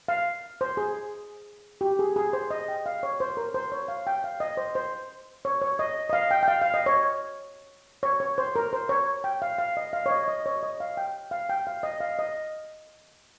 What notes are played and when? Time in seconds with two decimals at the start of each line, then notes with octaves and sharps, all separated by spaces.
0.08 F5
0.61 C5
0.77 G#4
1.81 G4
1.99 G#4
2.16 G#4
2.33 C5
2.51 D#5
2.68 G5
2.86 F5
3.03 C#5
3.20 C5
3.37 A#4
3.54 C5
3.72 C#5
3.88 F5
4.07 G5
4.24 F5
4.40 D#5
4.57 C5
4.75 C5
5.45 C#5
5.62 C#5
5.79 D#5
6.09 D#5
6.13 F5
6.31 G5
6.43 G5
6.48 F5
6.62 F5
6.74 D#5
6.86 C#5
8.03 C#5
8.20 C#5
8.38 C5
8.56 A#4
8.73 C5
8.89 C#5
9.24 G5
9.42 F5
9.58 F5
9.77 D#5
9.93 F5
10.06 C#5
10.11 D#5
10.28 D#5
10.46 C#5
10.63 D#5
10.80 F5
10.97 G5
11.31 F5
11.49 G5
11.67 F5
11.83 D#5
12.00 F5
12.19 D#5